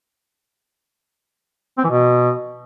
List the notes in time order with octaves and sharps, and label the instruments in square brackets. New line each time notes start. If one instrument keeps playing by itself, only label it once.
[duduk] C4
E3
B2